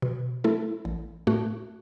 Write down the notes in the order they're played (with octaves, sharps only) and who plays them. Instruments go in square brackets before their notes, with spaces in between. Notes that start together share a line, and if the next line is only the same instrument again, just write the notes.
[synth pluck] B2
A3 E4 A4
A1
A2 A3 F#4